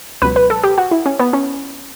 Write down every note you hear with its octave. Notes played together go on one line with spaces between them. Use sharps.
C#2 B2 F#3 B4
B4
A4
G4
F#4
E4
C#4
B3
C#4